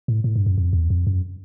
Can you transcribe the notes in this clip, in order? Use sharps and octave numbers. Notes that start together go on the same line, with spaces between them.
A2
A2
G2
F#2
F2
E2
F2
F#2